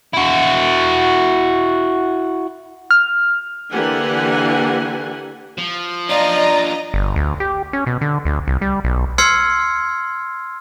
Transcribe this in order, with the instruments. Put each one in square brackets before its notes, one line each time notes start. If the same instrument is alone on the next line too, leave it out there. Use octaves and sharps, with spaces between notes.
[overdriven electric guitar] E4 F#4
[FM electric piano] F6
[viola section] D3 E3 A#3 G4 F#5 G#5
[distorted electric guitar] F3
[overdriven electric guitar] D4 F4 [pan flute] D5 [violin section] D#5 A#5
[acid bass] G1
D2
G4
C#4
B2
D3
D2
C2
G3
B1
[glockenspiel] C6 E6 F6 G#6 C7 C#7